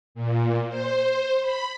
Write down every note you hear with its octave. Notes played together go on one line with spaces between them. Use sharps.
A#2
C5
B5